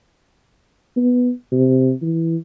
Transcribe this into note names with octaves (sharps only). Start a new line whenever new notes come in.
B3
C3
E3